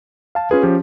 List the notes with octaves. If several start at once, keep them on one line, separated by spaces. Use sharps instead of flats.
F5 A5
C#4 F4 G#4 B4
F3 C#4 G4